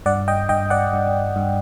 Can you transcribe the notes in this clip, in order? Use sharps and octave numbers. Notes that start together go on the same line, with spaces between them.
G2 D5 F#5
D#5 G5
G2 D#5 G5
D5 F#5
G2
G2